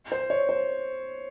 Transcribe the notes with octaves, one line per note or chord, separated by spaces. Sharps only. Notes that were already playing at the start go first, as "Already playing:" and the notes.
C5
C#5
C5